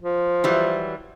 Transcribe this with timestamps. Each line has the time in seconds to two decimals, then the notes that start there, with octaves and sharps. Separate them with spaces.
0.03 F3
0.44 E3 F#3 G3